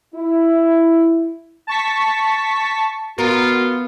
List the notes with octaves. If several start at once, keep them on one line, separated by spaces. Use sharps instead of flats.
E4
A5 C#6 B6
B3 F4 F#4 A#4